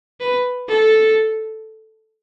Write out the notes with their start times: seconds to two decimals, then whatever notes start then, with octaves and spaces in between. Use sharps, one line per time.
0.20 B4
0.68 A4